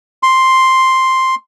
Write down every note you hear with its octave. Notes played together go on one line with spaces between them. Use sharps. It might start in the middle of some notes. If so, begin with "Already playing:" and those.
C6